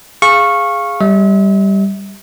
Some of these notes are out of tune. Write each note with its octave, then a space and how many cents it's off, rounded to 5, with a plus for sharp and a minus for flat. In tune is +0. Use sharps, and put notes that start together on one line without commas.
G#4 +0 F5 +0 C#6 -15
G3 +0 E5 -40